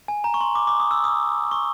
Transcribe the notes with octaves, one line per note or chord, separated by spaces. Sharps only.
G#5
A#5
C#6
C6
D6
D6
D#6
E6
D#6
C#6